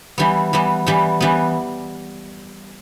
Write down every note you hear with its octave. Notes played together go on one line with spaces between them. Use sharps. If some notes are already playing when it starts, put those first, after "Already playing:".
E3 G3 B3
E3 G3 B3
E3 G3 B3
E3 G3 B3